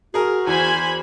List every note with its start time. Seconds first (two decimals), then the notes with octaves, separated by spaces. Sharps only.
0.14 F#4 G#4 A#4
0.47 E2 C5 G#5 B5